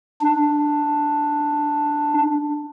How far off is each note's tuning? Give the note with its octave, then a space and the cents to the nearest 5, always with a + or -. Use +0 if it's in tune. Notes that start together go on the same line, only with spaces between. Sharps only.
D4 +5